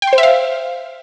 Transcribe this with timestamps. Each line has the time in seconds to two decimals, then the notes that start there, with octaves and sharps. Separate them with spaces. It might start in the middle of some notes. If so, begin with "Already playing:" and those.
0.02 G5
0.07 C6
0.13 C5
0.18 E5
0.23 F5